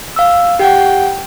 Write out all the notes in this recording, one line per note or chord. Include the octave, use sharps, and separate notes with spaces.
F5 E6
G4 F#5 G5